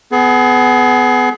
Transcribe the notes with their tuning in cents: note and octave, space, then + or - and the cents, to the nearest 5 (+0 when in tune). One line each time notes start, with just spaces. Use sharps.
B3 +20 G#4 +30